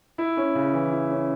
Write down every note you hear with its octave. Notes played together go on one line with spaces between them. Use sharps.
E4
C#4
C#3
E3
E4
C#4